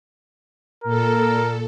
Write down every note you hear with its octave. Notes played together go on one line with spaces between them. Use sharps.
A#2 A4 A#4